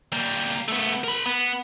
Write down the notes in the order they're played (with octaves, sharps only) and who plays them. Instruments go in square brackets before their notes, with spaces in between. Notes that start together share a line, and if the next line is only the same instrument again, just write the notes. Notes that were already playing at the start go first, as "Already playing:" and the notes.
[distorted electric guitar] G3 A#3
A3 B3
A#4 B5
B3